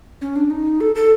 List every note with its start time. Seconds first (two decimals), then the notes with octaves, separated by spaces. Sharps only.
0.21 C#4
0.36 D4
0.50 D#4
0.81 A4
0.95 A4